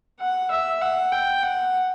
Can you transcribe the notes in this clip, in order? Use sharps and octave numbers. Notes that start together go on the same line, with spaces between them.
F#5
E5
F#5
G5
F#5